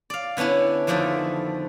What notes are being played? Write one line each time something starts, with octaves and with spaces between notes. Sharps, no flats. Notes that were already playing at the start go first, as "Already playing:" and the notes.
D5 F5
D3 B3 C#4 D4 E4
F2 D3 D#3 F3 A3 D5